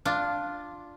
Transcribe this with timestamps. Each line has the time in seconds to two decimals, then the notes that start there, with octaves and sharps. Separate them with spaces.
0.05 D4 F4